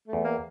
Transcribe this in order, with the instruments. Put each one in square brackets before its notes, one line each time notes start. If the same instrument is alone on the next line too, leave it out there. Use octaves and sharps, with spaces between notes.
[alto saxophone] A3
[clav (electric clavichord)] E2
[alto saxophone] A#3